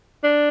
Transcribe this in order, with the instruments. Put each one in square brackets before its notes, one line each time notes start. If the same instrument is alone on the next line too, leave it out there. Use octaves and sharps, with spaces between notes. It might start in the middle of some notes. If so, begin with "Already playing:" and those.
[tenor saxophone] D4